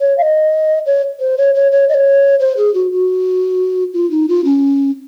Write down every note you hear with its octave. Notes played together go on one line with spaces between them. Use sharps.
C#5
F5
D#5
C#5
C5
C#5
C#5
C#5
D#5
C#5
C5
G#4
F#4
F#4
F4
D#4
F4
C#4